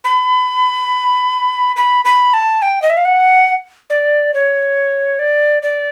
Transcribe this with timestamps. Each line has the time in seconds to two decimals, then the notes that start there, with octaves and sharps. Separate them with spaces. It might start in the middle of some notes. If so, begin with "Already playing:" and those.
0.04 B5
1.76 B5
2.05 B5
2.34 A5
2.62 G5
2.82 D#5
2.90 E5
2.97 F5
3.05 F#5
3.90 D5
4.34 C#5
5.19 D5
5.63 D5